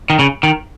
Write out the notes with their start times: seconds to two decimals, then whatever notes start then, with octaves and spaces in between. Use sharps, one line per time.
0.10 D#3
0.19 C#3
0.43 D#3